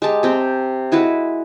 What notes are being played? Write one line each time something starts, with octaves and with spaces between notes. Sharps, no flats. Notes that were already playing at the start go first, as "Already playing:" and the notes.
G#3 G4 A5
C3 C4 G5
G#3 E4 F#4 B4